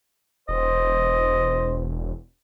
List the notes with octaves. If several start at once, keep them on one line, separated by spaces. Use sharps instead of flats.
E1 C5 D#5